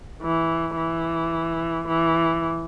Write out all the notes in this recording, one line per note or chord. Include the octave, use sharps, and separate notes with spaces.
E3
E3
E3